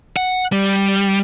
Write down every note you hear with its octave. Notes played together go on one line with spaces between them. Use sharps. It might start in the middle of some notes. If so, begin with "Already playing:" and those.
F#5
G3